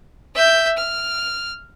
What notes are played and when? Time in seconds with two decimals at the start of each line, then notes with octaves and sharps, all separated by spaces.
0.36 E5 G6
0.77 F6